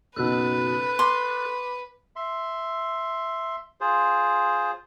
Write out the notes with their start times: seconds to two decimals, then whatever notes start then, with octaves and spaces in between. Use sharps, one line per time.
0.16 F#1 B2 D#4 A4 B4 F#6
0.99 C6 D6
2.16 E5 C6
3.81 F4 G#4 C5